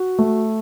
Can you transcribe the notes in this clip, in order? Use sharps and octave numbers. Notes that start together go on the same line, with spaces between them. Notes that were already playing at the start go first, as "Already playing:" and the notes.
Already playing: F#4
A3